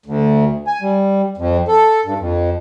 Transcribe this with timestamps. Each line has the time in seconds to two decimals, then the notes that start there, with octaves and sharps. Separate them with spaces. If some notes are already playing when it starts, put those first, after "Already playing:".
0.06 D2
0.67 G#5
0.82 G3
1.37 F2
1.68 A4
2.05 G2
2.19 F2